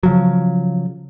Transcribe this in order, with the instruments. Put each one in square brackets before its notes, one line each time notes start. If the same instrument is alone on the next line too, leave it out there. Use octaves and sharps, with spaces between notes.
[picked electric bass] C#3 F3 F#3